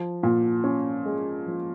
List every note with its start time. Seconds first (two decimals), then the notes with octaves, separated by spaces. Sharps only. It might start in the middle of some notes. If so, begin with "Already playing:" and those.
Already playing: F3
0.23 A#2
0.64 C#4
1.05 G#3
1.46 F3